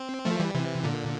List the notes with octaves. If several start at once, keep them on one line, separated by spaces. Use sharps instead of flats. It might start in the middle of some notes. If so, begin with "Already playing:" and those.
Already playing: C4
F3 A3
E3 G3
C3 E3
A#2 D3